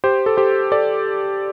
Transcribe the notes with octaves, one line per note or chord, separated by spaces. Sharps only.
G4 C5
A4
G4 C5
A4 D5